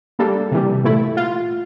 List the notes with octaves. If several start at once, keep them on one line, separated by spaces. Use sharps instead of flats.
G3 A#3 D4 A4
C3 E3 G3
A#2 A3 E4
F4